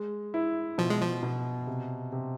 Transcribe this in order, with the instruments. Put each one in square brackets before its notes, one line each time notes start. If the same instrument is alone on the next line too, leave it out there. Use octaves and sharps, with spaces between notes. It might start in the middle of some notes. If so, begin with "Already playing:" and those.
Already playing: [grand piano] G#3
E4
[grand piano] B2 [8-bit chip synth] F3
[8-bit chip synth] G#3
F3
[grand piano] B2
C3
C3